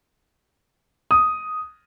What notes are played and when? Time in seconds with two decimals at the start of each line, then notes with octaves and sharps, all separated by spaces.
1.11 D#6